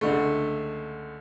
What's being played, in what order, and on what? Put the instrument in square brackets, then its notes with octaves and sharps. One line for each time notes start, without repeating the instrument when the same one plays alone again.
[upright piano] C#2 D3 A3